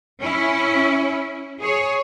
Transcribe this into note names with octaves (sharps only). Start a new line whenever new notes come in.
C#4 E4
G#4 C#5